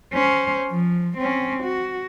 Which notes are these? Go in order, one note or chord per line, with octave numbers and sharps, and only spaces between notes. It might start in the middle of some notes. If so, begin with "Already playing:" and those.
C#4 C5
F3
C4 C#4
F#4